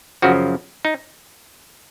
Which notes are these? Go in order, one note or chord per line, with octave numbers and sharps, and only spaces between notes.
F#2 C#3 F3 F#4
D#4